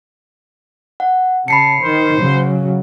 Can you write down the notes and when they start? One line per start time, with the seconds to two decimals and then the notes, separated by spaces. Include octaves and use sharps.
1.00 F#5
1.48 C#3 A5 B5 C7 C#7
1.82 D#3 C5
2.19 C#3 F#3